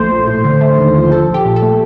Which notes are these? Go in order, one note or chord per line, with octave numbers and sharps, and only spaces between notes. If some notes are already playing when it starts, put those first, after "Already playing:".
Already playing: A#1 A3 C5
A#1
A2
D3
A3
D#2
F3
F3 A4
A#1
G4
A#2
A4
A3